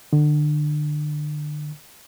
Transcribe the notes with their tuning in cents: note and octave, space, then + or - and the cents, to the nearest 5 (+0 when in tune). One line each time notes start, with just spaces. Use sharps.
D3 +30